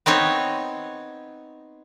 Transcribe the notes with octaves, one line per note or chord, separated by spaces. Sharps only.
B3 C4 D#4 C#5